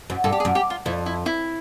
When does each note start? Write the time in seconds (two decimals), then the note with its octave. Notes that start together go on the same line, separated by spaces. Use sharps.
0.10 F#2
0.24 G2 A4
0.32 G4
0.40 G#4
0.45 F#2
0.55 G4
0.70 F4
0.86 F2 E4
1.06 E4
1.26 E4